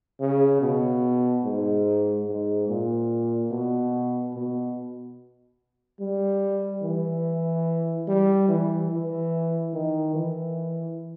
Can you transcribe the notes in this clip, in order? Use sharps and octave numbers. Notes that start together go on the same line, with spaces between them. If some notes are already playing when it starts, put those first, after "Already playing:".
C#3
B2
G#2
G#2
A#2
B2
B2
G3
E3
G3
E3
E3
D#3
E3